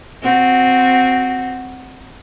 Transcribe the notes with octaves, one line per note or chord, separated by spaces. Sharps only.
C4 F#4